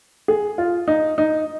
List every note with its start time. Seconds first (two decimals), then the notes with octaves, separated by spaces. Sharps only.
0.28 G#4
0.58 F4
0.88 D#4
1.18 D#4